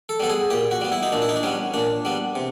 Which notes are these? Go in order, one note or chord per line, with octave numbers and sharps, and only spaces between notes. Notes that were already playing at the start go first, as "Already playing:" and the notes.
A4
G3 B3 A4
G#4
A#2 G4
F#4
G3 B3
E4
D#4
A#2 D4
E4
D#4
D4
G3 B3 C#4
A#2 D4
G3 B3
C3